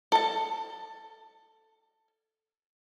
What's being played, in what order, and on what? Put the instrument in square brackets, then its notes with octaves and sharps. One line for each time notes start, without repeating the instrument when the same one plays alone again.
[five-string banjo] A4 A5